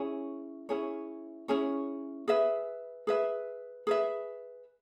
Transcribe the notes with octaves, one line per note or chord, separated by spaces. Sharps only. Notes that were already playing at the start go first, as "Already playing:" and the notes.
Already playing: C#4 E4 G#4 C#5
C#4 E4 G#4 C#5
C#4 E4 G#4 C#5
G#4 B4 E5
G#4 B4 E5
G#4 B4 E5